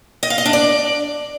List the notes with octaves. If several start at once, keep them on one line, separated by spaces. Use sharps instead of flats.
D#5
F5
D#5
D4
D5